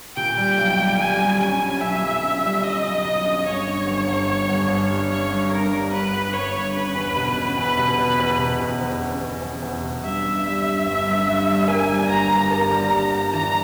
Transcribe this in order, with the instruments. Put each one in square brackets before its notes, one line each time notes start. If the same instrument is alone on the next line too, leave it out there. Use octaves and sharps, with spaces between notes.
[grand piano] A#2 [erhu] G5
[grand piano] G3
B1
G3
[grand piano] G3 [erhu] G#5
[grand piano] G3
[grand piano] C#4 [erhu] G#5
[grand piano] C#4
[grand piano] B1 [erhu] E5
[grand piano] B1
C#4
G3
[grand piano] C#4 [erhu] D#5
[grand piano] B1
B1
C#4
[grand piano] G1 [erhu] C#5
[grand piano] G2
G1
G1
G1
G1
G1
G3
[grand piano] G2 [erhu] C#5
[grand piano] G2
[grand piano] G2 [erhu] A#4
[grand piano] G3
[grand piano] G1 [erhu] B4
[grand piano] G1
[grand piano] G2 [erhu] C#5
[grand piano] G1
[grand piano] C#4 [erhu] B4
[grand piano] E2
B2
C#4
[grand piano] E2 [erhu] B4
[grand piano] B2
[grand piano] B2 [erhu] B4
[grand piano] E2
B2
E2
E2
C#4
E2
E2
E2
B2
[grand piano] G2 [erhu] E5
[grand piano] G2
G3
G2
G1
G2
G2
G3
[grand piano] A#3 [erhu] G#5
[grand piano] G3
[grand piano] G1 [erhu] A#5
[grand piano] G1
[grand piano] A#3 [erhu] A#5
[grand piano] G3
G3
G1
[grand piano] E3 [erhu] A#5